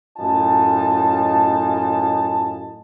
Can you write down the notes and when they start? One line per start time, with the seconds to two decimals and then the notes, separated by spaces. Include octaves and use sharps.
0.18 F#2 A2 D#4 F4 G#5 A5